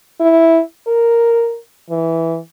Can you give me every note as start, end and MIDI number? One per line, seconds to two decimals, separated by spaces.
0.20 0.61 64
0.87 1.57 70
1.90 2.38 52